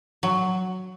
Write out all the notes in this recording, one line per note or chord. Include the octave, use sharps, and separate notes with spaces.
F#3